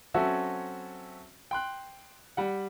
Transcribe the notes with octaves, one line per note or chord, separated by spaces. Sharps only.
F#3 C4 C#4 F#4 A4 E5
G5 C6 F#6
G3 F#5